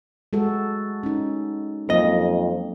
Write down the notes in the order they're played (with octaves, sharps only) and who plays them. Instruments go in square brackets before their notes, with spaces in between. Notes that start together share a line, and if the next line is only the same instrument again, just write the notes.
[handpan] G#3 F#4 A4
C#4 D#4
[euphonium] F2 [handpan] F#3 A#3 [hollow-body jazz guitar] D#5